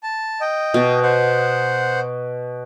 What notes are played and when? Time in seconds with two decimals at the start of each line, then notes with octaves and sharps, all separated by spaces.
0.03 A5
0.41 D#5 G5
0.74 B2
1.03 C5 F#5